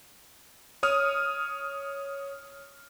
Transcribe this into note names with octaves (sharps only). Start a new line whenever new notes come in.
C#5 D#6 F6